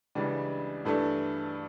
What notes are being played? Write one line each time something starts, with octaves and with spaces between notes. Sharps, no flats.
C#2 C#3 E3 G3 D4
G2 E3 A3 D4 A4